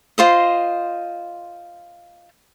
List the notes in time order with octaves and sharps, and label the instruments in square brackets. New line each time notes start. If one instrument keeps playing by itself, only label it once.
[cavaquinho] F4 C5 D#5